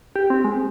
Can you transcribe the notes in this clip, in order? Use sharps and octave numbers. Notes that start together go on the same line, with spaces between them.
G4
C4
G#3